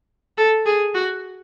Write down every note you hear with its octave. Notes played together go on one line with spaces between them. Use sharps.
A4
G#4
F#4